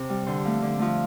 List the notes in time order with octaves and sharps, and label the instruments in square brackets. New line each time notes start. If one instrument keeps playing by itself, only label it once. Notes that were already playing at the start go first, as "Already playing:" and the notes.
Already playing: [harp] C3 C5
G3
D3 C5
F3 A3
D3
F3 A3